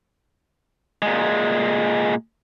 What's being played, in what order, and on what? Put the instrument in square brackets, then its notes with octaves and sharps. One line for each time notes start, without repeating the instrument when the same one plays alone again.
[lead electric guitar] A#2 G#3